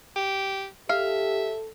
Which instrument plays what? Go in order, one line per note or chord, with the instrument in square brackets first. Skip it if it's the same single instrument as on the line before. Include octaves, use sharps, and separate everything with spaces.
[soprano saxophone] G4
[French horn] G4 [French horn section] A4 [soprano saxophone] E5 [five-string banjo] F5